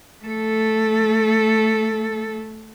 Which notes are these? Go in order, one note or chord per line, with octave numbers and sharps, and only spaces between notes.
A3 A4